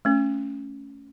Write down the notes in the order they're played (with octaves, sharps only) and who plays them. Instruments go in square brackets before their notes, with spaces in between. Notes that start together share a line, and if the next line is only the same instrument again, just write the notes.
[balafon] A3 C#4